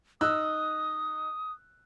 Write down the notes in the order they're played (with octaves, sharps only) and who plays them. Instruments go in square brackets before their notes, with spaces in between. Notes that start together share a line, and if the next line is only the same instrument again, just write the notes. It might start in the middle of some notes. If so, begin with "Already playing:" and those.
[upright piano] D#4 E6 F#6 [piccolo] D#6